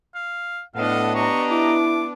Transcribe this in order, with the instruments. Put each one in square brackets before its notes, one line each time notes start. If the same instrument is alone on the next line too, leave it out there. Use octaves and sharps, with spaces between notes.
[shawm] F5
[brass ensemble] A2 [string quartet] B3 D4 [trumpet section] A4 D#5 F#5 [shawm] F5
[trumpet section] G4 D#5 A#5 [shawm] C#6
[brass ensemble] E4 [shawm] D6